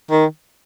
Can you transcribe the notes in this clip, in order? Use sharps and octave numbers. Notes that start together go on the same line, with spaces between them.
D#3